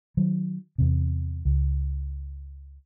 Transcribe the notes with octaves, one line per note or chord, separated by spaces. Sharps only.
D#3 F#3
E2 C3
C#2